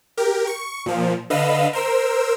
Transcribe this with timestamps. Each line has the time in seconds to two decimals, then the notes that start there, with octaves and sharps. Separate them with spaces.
0.17 G4 A#4
0.47 C#6
0.86 A#2 F3
1.30 D3 B4 D#5 F5 E6
1.73 A#4 C5 E6